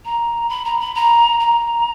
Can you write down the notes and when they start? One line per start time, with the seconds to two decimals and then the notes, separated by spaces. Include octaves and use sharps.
0.05 A#5
0.49 B5
0.65 A#5
0.80 B5
0.95 A#5
1.40 A#5